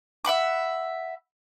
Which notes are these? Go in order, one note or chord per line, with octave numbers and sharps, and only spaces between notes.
E5 F#5 B5 D6